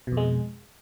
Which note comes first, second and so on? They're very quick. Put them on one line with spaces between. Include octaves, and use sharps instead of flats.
B2 F2 G#3